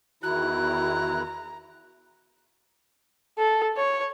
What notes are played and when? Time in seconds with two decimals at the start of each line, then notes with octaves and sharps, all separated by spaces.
0.23 E2 D#3 E4 F#4 A#5 F#6
3.38 A4
3.77 C#5